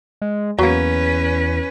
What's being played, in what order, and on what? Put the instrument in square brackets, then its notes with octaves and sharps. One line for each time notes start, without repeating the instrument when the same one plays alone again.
[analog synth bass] G#3
[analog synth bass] E2 [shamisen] F#3 A#3 [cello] C#4 B4